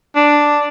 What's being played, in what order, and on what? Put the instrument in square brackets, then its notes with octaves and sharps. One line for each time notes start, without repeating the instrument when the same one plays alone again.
[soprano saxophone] D4